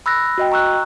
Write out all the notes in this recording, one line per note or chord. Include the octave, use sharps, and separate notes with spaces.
B5 E6 F#6 A#6
F#4 D#5 G5
A#5 C#6 E6 F#6